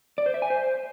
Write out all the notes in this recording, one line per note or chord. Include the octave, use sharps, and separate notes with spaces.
D5
C5
E5
G#5
C5